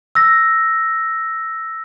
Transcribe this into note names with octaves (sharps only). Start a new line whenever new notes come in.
E6 A#6